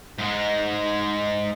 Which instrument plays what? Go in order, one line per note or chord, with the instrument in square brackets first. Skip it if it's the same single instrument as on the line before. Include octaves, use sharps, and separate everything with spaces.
[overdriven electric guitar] G#2 G#3